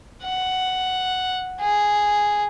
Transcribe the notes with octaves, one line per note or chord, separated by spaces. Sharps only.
F#5
G#4